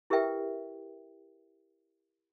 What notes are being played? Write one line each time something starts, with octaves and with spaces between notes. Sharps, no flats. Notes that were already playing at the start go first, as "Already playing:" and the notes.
E4 G4 A#4 B4 E5 G5